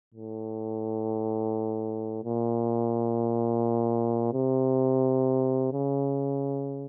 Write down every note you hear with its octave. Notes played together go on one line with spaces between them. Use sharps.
A2
A#2
C3
C#3